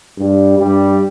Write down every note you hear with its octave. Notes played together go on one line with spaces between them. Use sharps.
G2 G3
G2 G3